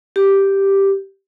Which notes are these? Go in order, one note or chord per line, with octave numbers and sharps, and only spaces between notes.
G4